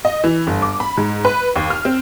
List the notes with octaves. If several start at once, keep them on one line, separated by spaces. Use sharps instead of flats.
D#5
E3
G1
D6
B5
G#2
B4
D#2
F6
C4